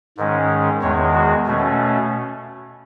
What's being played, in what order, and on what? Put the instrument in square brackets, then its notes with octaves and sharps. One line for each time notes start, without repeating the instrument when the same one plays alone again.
[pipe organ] G#2 D#3 G#3 C#4
E2 D#3 G#3 C#5
F#4
B2 A3 C#4